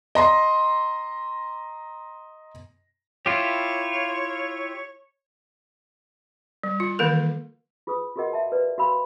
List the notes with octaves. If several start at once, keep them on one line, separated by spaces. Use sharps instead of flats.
D#5 A#5 C6
E4 F4 G4 C#5
G3
F4
D#3 E3 A#3 A4 A#4
F4 G#4 B4 D#6
F4 F#4 G#4 A#4 D#5 F#5
E5 A5
B4 D5
F#4 F5 B5